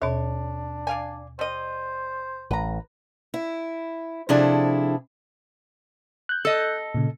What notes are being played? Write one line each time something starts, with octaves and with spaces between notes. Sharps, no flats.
D#2 B2 D4 C#5
D5 F5 G#5
G3 C5 D#5
A1 B4 A#5
E4
C3 F3 D4 E4 G#4 A4
F#6 G6
A4 D#5
A#2 C#3